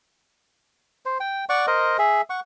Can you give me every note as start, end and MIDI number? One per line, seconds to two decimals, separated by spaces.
1.05 1.18 72
1.20 1.45 79
1.49 1.66 74
1.49 1.66 78
1.49 1.66 85
1.67 1.97 70
1.67 1.97 72
1.67 1.97 75
1.99 2.21 68
1.99 2.21 76
2.30 2.40 78
2.30 2.40 85